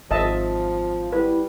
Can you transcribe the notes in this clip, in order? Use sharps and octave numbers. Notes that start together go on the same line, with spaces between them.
G#1 F3 D#5 E5 A5
G3 E4 B4